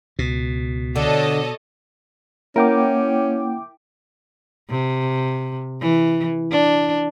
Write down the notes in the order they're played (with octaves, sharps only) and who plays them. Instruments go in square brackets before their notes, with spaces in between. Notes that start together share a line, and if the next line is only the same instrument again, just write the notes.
[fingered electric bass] C#2 [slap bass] B2
[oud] D3 [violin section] A4 C#5 D#5
[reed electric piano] A#3 F#5 [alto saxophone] C#4 [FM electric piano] E4 G5 D6 [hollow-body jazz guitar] A#4
[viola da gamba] C3
E3
D4